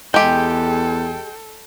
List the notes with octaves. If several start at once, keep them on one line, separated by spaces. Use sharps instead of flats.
E2 G#3 G4 A4 G5